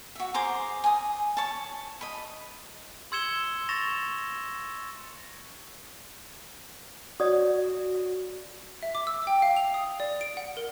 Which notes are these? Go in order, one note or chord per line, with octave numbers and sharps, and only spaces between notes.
F#4 E5
G#4 C5 A#5 D6
G#5 D#6
C#5 A5
D#5 B5
C6 E6 G#6 C#7 E7 G7
C#6 A6 A#6 E7 F7
F#4 C#5 D5 D#6
E5
D6
E6
G5
F5
F7
D#6
D5
D7
F#5
A#4